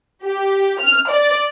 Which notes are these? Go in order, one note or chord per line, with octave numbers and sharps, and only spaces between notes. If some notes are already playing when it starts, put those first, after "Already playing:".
G4
F6
D5